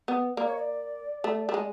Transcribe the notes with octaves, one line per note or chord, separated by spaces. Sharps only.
B3
A#3 D5
C#5
D#5
D5
A3
A3
G#3